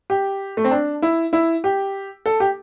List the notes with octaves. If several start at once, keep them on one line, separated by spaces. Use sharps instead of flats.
G4
A3
C4
D4
E4
E4
G4
A4
G4